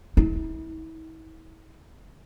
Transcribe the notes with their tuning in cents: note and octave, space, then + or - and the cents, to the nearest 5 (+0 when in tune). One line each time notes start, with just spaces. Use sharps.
E4 -40